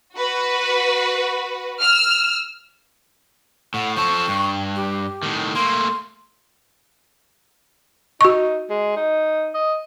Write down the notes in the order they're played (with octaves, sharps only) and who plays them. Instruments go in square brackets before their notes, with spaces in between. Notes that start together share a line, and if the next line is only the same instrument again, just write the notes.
[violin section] F#4 B4
E6 F6
[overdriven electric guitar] A2 [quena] F#5
[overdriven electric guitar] F3 A4 [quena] C#6
[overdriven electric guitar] G2
[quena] G4
[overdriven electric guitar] A2 D#3
[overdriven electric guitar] A3 A#3 [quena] C6
[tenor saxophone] D#4 [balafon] F#4 C#6
[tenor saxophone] G#3
D#4
D#5